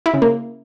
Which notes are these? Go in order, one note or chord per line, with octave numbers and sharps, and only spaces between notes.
E4
C#3
A#3